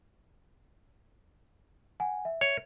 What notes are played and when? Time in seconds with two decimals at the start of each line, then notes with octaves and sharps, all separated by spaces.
2.00 F#5 G#5
2.25 E5
2.41 C#5